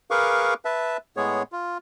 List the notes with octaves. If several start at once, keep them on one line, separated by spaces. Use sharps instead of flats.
G#4 A#4 B4 F5 C#6 D6
B4 E5 A5
A2 G#3 B3 G#4 C#5
F4